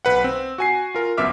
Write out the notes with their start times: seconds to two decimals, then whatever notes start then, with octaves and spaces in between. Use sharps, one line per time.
0.05 B1 B4 F#5
0.24 C4
0.58 F#4 G#5 C7
0.95 F4 A#4
1.17 G1 F#2 B3 E5 D6 F6